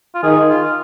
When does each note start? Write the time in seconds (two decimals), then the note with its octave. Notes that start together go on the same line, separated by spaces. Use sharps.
0.15 F4
0.23 D#3 G#4
0.49 F4